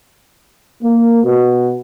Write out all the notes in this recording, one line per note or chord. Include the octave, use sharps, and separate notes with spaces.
A#3
B2